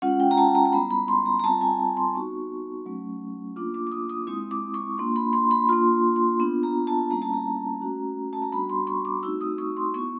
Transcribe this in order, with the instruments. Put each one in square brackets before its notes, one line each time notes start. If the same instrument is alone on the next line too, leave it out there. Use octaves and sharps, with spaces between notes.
[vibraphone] G#3 C#4 F4 F#5
G5
A#5
A5
A#5
A#5
G3 B3 E4 B5
B5
C6
A#5
A#5
G3 C4 F4 A5
G#5
A#5
C6
B3 D#4 F#4 C#6
F#3 A3 C#4
A#3 D4 F4 D6
D6
D6
D#6
D#6
G#3 C4 E4 D#6
D6
C#6
A#3 D4 F4 C6
B5
C6
B5
A#3 D4 F4 C6
C6
B3 D4 F4
A#5
A5
G3 A#3 C#4 E4 A#5
A5
A#5
A3 C#4 F#4
A5
A#5
G3 B3 D4 F#4 B5
C6
C#6
D6
A3 C4 D#4 F#4 E6
D#6
C#6
C6
B3 E4 C#6